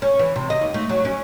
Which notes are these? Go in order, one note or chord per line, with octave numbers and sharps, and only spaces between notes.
C#4
E3
C3
D#5
D#2
A3
F#3
C#4